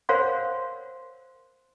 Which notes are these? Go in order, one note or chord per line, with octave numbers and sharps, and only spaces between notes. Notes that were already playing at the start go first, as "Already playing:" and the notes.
A#4 C5 C#5 F5 F#5 C6